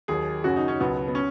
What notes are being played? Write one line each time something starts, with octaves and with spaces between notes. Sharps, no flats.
D#2 D#3 F#3 G#4
F#2 C#3 F#3 F#4
D#4
C#4
C#2 B2 F#3 B3
B3
C#4